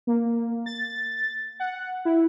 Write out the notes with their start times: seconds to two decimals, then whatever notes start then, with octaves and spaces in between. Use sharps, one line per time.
0.07 A#3
0.66 A6
1.60 F#5
2.05 E4